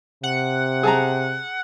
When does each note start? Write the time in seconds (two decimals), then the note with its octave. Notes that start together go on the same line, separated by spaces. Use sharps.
0.23 C3 F#5
0.83 G#4 A5 A#5